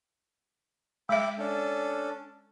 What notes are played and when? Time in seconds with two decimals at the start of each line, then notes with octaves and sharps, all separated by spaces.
1.09 G#3 E5 G5 B5 D6
1.38 C#4 D4 A4